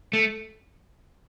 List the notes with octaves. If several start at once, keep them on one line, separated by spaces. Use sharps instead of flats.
A3